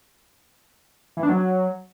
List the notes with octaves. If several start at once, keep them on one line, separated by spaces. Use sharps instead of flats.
E3
D4
F#3